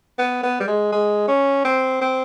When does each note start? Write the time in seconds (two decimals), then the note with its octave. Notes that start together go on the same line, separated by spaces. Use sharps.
0.18 B3
0.43 B3
0.60 G3
0.67 G#3
0.92 G#3
1.28 C#4
1.64 C4
2.01 C4